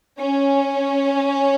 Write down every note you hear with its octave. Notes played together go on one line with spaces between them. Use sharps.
C#4